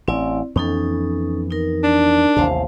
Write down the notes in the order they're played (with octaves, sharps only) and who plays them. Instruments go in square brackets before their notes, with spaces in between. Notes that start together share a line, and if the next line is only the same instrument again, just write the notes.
[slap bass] A1 [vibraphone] C4 E4 D5
[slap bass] F2 E3 B3 [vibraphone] C#4 D#4 A4
[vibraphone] D#4 A#4
[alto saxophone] D4
[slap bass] A1 D#2 C3 [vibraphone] C5 F5 A5